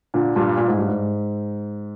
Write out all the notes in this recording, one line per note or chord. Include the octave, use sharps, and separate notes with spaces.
A#2 D3
G2 A#2
A#2
G#2
G2
G#2